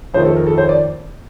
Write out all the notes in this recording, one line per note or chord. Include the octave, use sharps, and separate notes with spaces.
F2 D#3 A3 C5
A4
A#4
A4
C5
D5